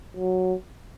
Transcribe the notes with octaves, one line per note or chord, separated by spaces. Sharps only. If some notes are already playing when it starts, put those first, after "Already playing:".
F#3